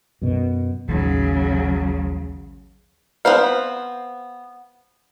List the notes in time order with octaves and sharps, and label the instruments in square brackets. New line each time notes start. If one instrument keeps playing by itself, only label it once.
[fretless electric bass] F#2 B2
[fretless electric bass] A1 D#2 [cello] C#3 F#3
[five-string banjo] B3 C4 C5 F5